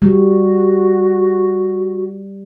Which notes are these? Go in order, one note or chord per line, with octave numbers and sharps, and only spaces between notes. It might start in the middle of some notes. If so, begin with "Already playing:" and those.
G3 F#4